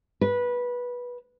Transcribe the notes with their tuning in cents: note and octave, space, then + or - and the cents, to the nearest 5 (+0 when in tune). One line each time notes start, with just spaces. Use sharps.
B4 -15